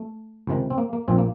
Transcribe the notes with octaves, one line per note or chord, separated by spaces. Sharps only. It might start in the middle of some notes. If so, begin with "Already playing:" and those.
Already playing: A3
C#2 C3 D#3
C4
A#3
A#3
A#1 A#2 C4
A#3